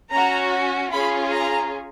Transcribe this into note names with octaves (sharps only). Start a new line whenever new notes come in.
C#4 F#4 A#5
C#4 F4 G#4 B5
A#5